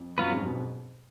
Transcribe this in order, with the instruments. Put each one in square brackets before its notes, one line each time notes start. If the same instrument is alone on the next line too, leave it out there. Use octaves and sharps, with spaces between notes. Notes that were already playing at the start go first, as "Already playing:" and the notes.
Already playing: [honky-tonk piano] F2
[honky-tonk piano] F#2 [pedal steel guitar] F#3 B3 F4 B4
[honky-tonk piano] F2 G#2
B2